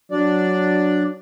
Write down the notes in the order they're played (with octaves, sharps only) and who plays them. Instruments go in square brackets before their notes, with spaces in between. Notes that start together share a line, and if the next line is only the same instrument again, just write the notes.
[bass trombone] F#3 [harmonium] D4 D5